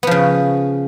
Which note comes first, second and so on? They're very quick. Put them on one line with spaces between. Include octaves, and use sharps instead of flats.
B3 F3 C#3